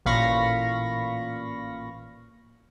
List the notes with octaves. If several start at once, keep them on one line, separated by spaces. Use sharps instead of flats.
A1 A#2 F5 B5 C#6 A#6